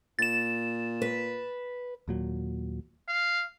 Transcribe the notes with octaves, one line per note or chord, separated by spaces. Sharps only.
A#2 A6 E7
B4
D#2 A#2 F#3
F5